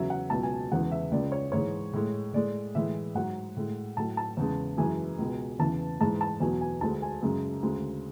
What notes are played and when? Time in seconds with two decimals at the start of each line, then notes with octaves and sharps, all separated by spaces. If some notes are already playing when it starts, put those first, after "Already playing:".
Already playing: E2 C#3 F#3 E5
0.10 F#5
0.30 C#2 B2 F#3 A5
0.43 G#5
0.71 E2 C#3 E3 G#3 F#5
0.91 E5
1.11 C#2 C#3 G#3 D5
1.32 C#5
1.52 G#2 E3 G#3 C#5
1.93 A2 G#3
2.33 A2 G#3 D5
2.75 A2 E3 G#3 E5
3.15 G#2 F#3 F#5
3.57 A2 G#3
3.97 A2 F#3 A5
4.17 A5
4.37 E2 C#3 G#3
4.78 F#2 E3 G#3 G#5
5.18 C#2 B2 G#3
5.59 E2 C#3 E3 A5
6.00 G#2 E3 G#3 A5
6.21 A5
6.40 E2 B2 F#3 G#5
6.61 G#5
6.81 D2 D3 G#3 A5
7.02 G#5
7.22 F#2 C#3 G#3
7.62 D2 C#3 G#3